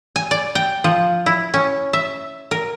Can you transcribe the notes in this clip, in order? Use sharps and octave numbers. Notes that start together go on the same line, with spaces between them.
G#5
D5
G5
F3
E4
C#4
E5
A#4